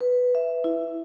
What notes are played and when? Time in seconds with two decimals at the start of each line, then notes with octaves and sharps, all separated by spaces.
0.01 B4
0.35 E5
0.64 E4